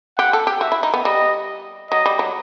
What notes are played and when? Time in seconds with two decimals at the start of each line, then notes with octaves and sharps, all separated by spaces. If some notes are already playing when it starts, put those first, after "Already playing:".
0.18 G4 F#5
0.33 A4
0.47 G4
0.61 F#4 E5
0.72 E4
0.83 D#4
0.94 B3
1.04 G3 D#5
1.91 F#3 D#5
2.06 G3
2.19 F#3